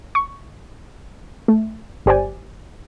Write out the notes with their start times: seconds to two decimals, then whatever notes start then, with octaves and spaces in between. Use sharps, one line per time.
0.15 C#6
1.48 A3
2.06 G1 G4 C5 D5 G#5